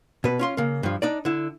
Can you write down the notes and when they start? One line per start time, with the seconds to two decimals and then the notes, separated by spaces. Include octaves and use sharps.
0.24 B2 B4
0.39 C#4 F4 C6
0.57 C#3 A#3
0.83 G2 F3
1.02 D4 D#4 D5
1.25 D3 E4